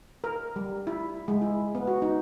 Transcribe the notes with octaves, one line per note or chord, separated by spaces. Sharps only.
A#4
G3
E4
G#3
E4
B3
F#4
D#4